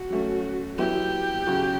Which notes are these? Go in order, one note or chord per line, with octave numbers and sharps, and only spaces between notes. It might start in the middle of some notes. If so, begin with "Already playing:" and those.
Already playing: F#4
F#3 A3 C#4
F#3 B3 E4 G4
C#3 F#3 C#4 F#4